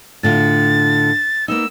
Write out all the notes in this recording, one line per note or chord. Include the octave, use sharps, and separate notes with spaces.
A2 D3 F4 A6
A#3 B3 D#4 E6